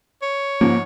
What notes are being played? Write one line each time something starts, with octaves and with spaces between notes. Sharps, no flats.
C#5
G#2 F3 A#3